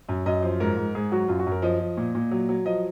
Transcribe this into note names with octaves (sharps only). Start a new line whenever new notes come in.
F#2
F#2 D#5
F3 C5
G#2 A#4
G#2
G#2 G#4
F#3 F#4
F#2 F4
F#4
F#2
A#4
F3 D#5
F3
A#2
A#2
F#3
F#3
F3 D#5